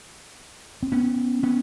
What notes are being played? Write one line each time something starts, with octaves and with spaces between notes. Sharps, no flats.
C4
B3 C#4
B3 C#4